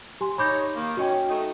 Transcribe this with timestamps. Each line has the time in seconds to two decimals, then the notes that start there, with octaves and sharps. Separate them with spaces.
0.21 G4 G#5 C6
0.38 D#4 C#5 B5 D6 G6
0.75 D#3 A#3
0.97 C#4 F#4 D#5 G5
1.29 A3 D#4